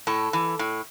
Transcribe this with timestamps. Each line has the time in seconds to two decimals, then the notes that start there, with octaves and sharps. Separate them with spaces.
0.07 A2 A4
0.33 E3
0.59 A2